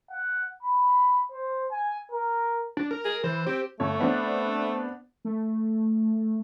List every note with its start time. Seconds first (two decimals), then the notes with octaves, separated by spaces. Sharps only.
0.11 F#5
0.63 B5
1.31 C5
1.72 G#5
2.12 A#4
2.77 D4
2.91 A#4
3.05 G#4
3.24 E3 C5
3.47 C4 G4
3.80 G1 A3 C#5
4.00 B3 C4 D4
5.25 A3